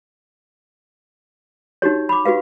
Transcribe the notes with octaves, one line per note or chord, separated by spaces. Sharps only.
D#4 F#4 G4 C#5
B5 D6
F#4 G4 B4 F5